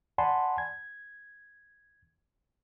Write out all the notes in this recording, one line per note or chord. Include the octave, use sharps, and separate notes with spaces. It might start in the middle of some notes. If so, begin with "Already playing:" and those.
D5 F#5 G#5 A5 B5 C6
G#6